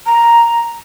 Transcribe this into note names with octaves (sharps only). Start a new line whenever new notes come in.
A#5